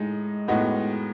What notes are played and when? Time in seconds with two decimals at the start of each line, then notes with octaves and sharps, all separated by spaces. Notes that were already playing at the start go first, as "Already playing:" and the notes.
Already playing: A2 G#3 D#4
0.48 A2 G#3 B3 D#4 F#4